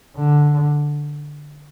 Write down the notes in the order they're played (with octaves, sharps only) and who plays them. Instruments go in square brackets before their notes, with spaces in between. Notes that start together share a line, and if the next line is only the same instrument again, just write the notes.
[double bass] D3